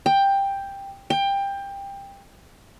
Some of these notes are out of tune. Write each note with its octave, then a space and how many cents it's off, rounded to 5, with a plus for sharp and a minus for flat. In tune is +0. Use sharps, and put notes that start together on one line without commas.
G5 +10
G5 +20